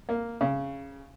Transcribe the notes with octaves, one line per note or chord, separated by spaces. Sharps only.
A#3
C#3